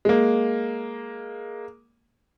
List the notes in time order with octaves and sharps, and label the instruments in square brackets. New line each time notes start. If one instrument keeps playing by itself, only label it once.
[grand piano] G#3 A#3